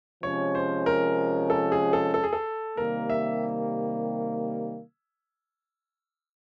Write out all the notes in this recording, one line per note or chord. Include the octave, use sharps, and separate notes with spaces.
C3 F3 G#3 C#4 C#5
C5
A#4
A4
G#4
A4
A4
G#4
A4
C3 D#3 G3 A#3 A#4
E5